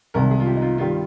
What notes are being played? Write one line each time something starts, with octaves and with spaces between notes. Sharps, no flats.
C2 C3 D#3 G#3 A#4
G#4
F4
G4
D#4
F4
G2 D#3 G3 F4